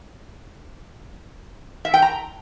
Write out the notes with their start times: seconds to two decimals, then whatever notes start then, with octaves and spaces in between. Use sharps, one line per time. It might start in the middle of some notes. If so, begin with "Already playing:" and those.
1.85 E5
1.94 G5
2.02 A#5